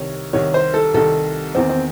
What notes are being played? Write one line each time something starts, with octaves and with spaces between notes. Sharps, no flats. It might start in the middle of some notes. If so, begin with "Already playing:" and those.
Already playing: C2 C3 D#3 C#5
C2 C3 D#3 C#5
C5
A4
C2 C3 D#3 A4
E2 D#3 C4
C4